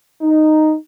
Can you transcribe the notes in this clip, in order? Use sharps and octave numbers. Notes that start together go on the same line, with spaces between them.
D#4